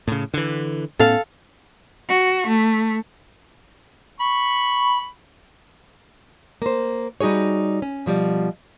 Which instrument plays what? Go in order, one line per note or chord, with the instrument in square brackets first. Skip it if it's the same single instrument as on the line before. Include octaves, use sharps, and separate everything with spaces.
[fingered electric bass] A2 C#3
D3 E3
[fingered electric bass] A2 B3 C#4 [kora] A4 F5
[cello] F#4
A3
[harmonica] B5 C#6
[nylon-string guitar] A#3 C5
G3 D#4 F#4 G#4 C#5
C#4
B2 F3 G3